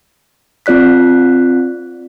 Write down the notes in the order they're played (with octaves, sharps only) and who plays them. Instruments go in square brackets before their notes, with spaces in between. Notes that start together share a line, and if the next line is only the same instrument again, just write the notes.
[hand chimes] C4 F4 D5 F#6 B6